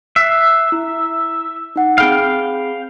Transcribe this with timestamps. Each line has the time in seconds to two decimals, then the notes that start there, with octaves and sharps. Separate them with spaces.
0.16 E5 F#6 C7
0.69 E4 E6
1.76 D#4 F#5
1.98 C4 G#4 F5 G5 B5